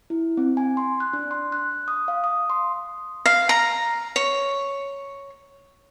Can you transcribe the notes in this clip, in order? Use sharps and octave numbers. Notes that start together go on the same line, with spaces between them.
E4
C4
G#5
C6
F#6
D4
C6
F#6
D#6
F5
D#6
C6
F5
A#5
C#5